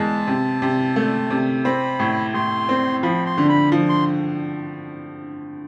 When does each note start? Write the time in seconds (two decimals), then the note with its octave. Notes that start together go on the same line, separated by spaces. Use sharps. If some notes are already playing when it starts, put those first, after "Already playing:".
Already playing: E2 G#3 A5
0.27 C3
0.62 C3
0.96 A3
1.30 C3
1.65 C4 B5
1.99 A2
2.34 A2 C6
2.69 C4
3.03 F3 B5
3.26 C6
3.38 D3
3.49 B5
3.72 F3
3.89 C6